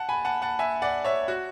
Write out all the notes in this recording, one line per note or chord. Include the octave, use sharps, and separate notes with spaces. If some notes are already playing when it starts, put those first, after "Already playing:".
Already playing: F#5 A5
G#5 B5
F#5 A5
F#5 A5
E5 G#5
D5 F#5
C#5 E5
F#4